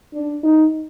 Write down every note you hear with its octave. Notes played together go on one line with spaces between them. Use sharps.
D4
D#4